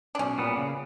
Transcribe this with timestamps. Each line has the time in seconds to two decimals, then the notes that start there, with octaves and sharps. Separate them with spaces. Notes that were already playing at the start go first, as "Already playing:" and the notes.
0.15 D4
0.19 B1 C#4
0.38 A#2 G3 B3
0.57 C#3